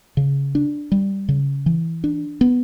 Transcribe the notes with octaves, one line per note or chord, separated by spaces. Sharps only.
C#3
D4
G3
C#3
E3
D4
B3